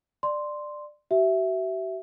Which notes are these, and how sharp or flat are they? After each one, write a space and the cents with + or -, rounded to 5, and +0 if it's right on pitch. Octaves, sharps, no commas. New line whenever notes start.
D5 +15 C6 +0
F#4 +45 E5 +0